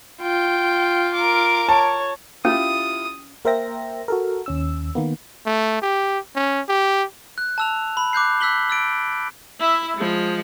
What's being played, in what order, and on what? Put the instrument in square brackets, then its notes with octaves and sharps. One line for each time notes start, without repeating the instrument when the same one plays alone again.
[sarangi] F4 [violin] G5
[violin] A#4 D6
[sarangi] C#5 [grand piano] A5
[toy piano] C#4 [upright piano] E4 F4 G4 [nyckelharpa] D#6
[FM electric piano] A#3 A#4 C5 E5 G5 A#6
F#4 A4 A#4
D#2 C#4 E6
D#3 A#3 B3
[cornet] A3
G4
C#4
G4
[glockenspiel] F#6
A5 E6 F7
B5
D6 F#6 G6 C7
E6 F#6 B6 F#7 G7
E6 A6 D7
[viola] E4 E5
F3 G#3